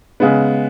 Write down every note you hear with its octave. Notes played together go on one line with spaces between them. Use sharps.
C#3 G#3 B3